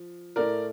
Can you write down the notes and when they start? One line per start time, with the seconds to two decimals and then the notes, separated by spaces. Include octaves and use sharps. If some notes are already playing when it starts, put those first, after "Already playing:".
Already playing: F3
0.36 A2 A3 A#4 D5